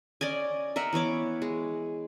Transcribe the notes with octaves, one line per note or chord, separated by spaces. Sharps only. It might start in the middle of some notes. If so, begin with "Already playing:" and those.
C#4 D5 D#5 G#5
A#4 D#5 E5 F#5
E3 B3 C#5 D6
G#3